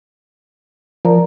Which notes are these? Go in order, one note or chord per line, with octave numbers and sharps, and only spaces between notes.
F3 A#4 D5 A#5